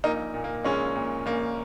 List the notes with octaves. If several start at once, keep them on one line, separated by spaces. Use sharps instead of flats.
A#1 A#3 D#4
A#2
A#3
A#1 G#3 C#4
A#2
A#1 A#3